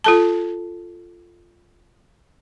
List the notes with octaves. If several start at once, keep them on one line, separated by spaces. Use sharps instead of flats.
F4 A4 A5